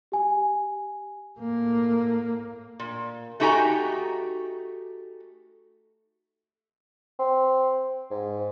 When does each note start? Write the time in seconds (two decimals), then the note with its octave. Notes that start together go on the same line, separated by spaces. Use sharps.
0.12 G4 G#5
1.38 A2 A#3
2.80 A#2
3.40 A3 D#4 F#4 G4 G#5 A#5
7.19 C4
8.11 G#2